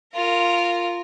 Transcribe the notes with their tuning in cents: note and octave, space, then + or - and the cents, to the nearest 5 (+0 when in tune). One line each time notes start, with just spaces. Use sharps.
F4 +0 A#4 -15